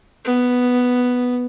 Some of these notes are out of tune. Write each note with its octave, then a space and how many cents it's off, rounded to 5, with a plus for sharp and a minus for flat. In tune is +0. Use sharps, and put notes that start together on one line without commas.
B3 +0